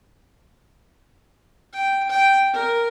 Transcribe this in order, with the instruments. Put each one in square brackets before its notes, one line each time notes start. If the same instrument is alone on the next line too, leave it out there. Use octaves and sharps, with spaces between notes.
[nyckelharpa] G5
G5
A#4